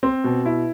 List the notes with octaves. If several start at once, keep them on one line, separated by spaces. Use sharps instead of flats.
C4
B2
E4